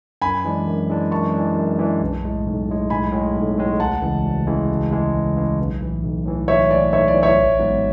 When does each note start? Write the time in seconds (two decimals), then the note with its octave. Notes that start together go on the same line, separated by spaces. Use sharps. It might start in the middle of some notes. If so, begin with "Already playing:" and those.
0.22 F#2 G#5 B5
0.45 E3 G#3 D4
0.67 F#2
0.90 E3 G#3 D4
1.11 F#2 A5 C#6
1.34 E3 G#3 D4
1.56 F#2
1.78 E3 G#3 D4
2.01 B1
2.24 A2 G#3
2.46 B1
2.68 A2 G#3
2.90 B1 G#5 B5
3.12 A2 G#3
3.35 B1
3.57 A2 G#3
3.80 D2 F#5 A5
4.01 C#3 E3 G#3
4.24 D2
4.47 C#3 E3 G#3
4.69 D2
4.91 C#3 E3 G#3
5.14 D2
5.36 C#3 E3 G#3
5.59 B1
5.80 A2 E3
6.03 B1
6.25 A2 E3
6.48 B1 C#5 E5
6.70 A2 E3 D5
6.92 B1 C#5 E5
7.08 D5
7.14 A2 E3
7.23 C#5 E5
7.37 A1
7.59 G#2 F#3 B3